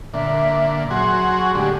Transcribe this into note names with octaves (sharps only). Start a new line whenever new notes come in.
A#2 D3 E5
F#3 F#4 G#4 C6
C#6
A2 D3 G#3 G4